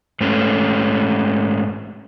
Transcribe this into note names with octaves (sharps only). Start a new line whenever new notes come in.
G#2 A3 C#4